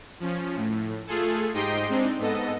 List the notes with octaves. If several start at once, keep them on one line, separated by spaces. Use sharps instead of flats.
F3 C#4
A2
A3 F4 G#4 A4
G#2 D#4 G4 D#5 G5 C6
G#3 C4 D4 D#4
G#2 B3 A4 D#5